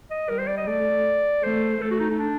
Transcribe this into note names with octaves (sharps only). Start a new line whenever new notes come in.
D#5
G3 A#4
C5
D5
D#5
A3 D5
A3 C5
A3 A4
F#4
D#4
D#4
D4